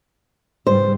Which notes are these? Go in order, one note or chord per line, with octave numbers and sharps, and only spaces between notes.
G#2 C#3 G3 C5